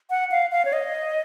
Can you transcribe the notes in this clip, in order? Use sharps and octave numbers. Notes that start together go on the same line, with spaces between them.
F#5
F5
F5
C#5
D#5